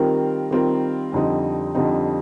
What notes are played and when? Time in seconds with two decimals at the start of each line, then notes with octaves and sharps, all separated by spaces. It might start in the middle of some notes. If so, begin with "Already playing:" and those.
Already playing: D#3 G3 C4 F4 A#4
0.51 D#3 G3 C4 F4 A#4
1.13 F2 D3 G3 C4 D#4
1.75 F2 D3 G3 C4 D#4